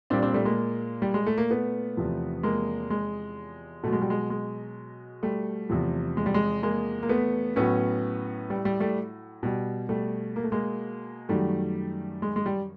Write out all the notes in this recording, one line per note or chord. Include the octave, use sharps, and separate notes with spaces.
A#2 G3 C4 D4
C4 D4
G3 A3
G#3 A#3
G3
G#3
A3
A#3
A3 B3
E2 C3 F3
G#3 A#3
G#3
B2 F#3 A3
G#3
G3
G#3
G#3
G3 A3
E2 C3 F3
G#3
G3
G#3
G#3 A#3
A#3
A3 B3
A2 F#3 B3 C#4
G3
G3
G3 A3
B2 G3
G3 A3
A#3
A3
G#3 A#3
F#2 D#3 F#3 G3 A3
G#3
G#3
G3